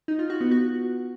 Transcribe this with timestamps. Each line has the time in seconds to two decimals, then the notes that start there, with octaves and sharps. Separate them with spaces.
0.08 D#4
0.19 F4
0.30 F#4
0.41 B3
0.51 F#4